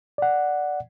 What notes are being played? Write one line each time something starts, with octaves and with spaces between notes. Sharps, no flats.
D5 F#5